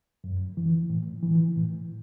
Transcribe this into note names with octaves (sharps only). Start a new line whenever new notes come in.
F#2
E3
A2
E3
A2